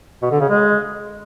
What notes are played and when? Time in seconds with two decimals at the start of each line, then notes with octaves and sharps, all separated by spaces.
0.22 B2
0.31 D3
0.40 C#3
0.49 G#3